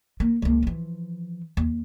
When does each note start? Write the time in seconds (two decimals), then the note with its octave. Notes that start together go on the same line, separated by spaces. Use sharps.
0.20 A#3
0.42 C#2 A#3
0.63 E3 F3
1.57 D#2